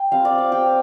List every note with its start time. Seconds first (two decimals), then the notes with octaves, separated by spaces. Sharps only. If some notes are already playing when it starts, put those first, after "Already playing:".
Already playing: G5
0.12 G3 C4 F4 F5
0.25 D5
0.38 F5
0.52 G3 C4 F4 G5